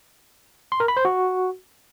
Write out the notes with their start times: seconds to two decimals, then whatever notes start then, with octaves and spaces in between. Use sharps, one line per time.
0.72 C6
0.80 A#4
0.88 B5
0.97 C5
1.05 F#4